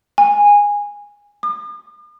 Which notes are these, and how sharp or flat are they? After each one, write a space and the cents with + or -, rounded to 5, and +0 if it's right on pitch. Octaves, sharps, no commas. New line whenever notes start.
G#5 -15
D#6 -45